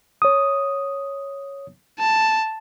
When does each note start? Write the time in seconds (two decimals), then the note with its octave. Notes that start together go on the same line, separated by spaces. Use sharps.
0.22 C#5 D#6
2.00 A5